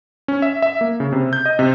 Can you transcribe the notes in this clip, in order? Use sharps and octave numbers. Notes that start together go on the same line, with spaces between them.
C#4
E5
E5
A#3
C#3
C3
G6
D#5
C3